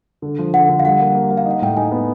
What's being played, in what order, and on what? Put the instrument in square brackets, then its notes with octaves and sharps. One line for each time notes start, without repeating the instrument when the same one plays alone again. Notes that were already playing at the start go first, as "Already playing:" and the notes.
[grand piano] D3
F3
[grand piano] D3 [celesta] F#5
[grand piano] D3
[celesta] F5
[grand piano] G3 [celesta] F#5
[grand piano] A#3
A#3
A#3
[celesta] F5
[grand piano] D#4
[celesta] F#5
[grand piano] A2 [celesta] G5
[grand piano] D#4 [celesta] G#5
[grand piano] B3